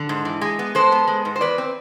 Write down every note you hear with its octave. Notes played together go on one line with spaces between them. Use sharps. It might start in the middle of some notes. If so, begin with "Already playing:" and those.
Already playing: D3
G#2
E3
G#3
B3
G#3 A4 C5
B3
G#3
G#2
C5
E2 B4 D5
C4